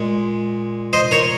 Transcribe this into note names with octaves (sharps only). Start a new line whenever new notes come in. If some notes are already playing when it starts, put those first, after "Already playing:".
Already playing: A#2 G#3
C5 D#5
A#4 C#5